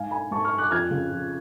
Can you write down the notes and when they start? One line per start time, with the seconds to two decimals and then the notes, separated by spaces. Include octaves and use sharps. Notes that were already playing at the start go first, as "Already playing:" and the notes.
Already playing: G#2 F5 G#5
0.11 G#5 B5
0.31 G#2 A5 C#6
0.44 C#6 F6
0.58 D6 F#6
0.71 F2 F6 G#6
0.91 C#3
1.12 F2